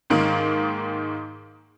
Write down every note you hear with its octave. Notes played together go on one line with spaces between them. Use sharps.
G#2 D#3 A#3